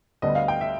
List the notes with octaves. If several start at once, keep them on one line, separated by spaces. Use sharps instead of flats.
D2 D3 G3 B3 D#5
F5
G5
E5